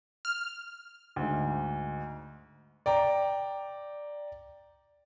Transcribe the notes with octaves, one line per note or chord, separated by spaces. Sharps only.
F6
D2 G#2
D5 G5 A#5